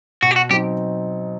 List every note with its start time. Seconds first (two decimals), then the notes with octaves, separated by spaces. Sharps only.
0.22 B2 F#4
0.31 G4
0.36 F#4
0.50 F#3 C4 D#4 G4